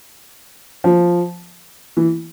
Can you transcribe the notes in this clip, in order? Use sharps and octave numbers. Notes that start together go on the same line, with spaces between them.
F3
E3